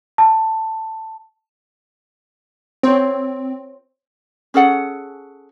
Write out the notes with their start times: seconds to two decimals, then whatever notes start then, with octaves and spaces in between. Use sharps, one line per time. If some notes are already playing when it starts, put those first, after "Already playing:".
0.18 A5
2.83 C4 C5 C#5
4.54 C#4 G#4 A4 F#5